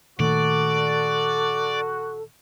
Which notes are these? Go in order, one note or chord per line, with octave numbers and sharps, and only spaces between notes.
A#2 D#3 A3 F#4 A4 D5